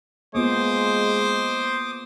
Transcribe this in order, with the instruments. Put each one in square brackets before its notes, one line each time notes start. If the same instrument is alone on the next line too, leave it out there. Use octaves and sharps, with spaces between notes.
[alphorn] G#3 [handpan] A#3 B3 F4 [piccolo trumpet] C5 [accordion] D6 D#6